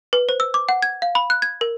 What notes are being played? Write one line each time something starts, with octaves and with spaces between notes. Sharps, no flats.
B4
C5
E6
D6
F#5
G#6
F5
B5
F#6
G#6
A#4